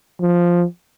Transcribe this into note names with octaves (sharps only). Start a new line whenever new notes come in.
F3